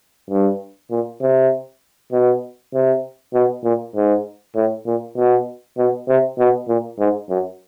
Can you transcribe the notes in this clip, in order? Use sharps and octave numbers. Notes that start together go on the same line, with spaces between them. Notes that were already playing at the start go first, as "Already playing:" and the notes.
G2
A#2
C3
B2
C3
B2
A#2
G#2
A2
A#2
B2
B2
C3
B2
A#2
G#2
F#2